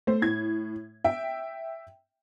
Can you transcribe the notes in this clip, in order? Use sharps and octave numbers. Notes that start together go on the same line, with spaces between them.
A3 C5
A2 G#6
E5 G5